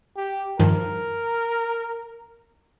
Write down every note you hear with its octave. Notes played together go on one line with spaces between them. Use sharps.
G4
G2 D#3 F3 A#4